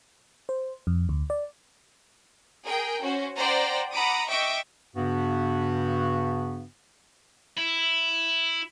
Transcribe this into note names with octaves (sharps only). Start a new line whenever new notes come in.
C5
F2
D2
D5
G#4 A#4 G5
C#4 F#4 C5
C5 D5 F#5 G5 A#5
F#5 A#5 B5 D6 D#6
D#5 E5 G5 C#6 D6
G2 C#3 B3 F#4
E4